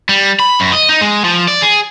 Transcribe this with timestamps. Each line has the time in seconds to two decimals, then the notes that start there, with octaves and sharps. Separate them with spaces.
0.09 G3
0.40 B5
0.60 F#2
0.73 D#5
0.89 D#4
1.01 G#3
1.24 F3
1.48 D5
1.62 G#4